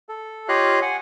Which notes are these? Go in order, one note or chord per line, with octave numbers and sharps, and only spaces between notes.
A4
F4 G4 C#5 D#5 F5 F#6
F#5 G#5